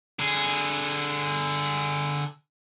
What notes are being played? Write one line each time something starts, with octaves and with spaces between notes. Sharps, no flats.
D3 G#4